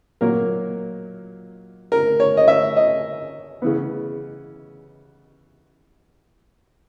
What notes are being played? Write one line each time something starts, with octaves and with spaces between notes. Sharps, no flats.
A#2 F#3 A#3 A#4
A#4
C#5
D#5
E5
D#5
C#3 E3 B3